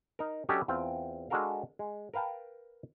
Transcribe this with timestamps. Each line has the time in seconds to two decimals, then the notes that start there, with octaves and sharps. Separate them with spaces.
0.19 D#4 A#4
0.49 F#3 C#4 D4 G4 A4 D#5
0.68 E2 C4 F4 G5
1.30 G#3 D4 F#4 A4 A#4 F5
1.79 G#3
2.14 A#4 B4 F5 G5 A5